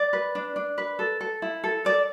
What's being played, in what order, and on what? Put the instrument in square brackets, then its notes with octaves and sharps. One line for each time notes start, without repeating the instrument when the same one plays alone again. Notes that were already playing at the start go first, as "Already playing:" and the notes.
Already playing: [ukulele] D5
B4
D4
D4
B4
A4
A4
E4
A4
A4 D5